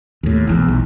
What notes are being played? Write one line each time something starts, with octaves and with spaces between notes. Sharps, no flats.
D#2 A2
E1 A#1 E2
B1